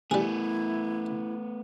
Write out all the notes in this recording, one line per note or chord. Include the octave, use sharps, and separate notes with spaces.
G3 A3 B3 E4 G#4